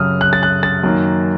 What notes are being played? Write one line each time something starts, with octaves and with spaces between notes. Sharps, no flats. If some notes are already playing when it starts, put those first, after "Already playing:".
Already playing: F#2 C#3 F#3 D#6 F6
F#6
A6
F#6
A6
F#2 D#3 A#3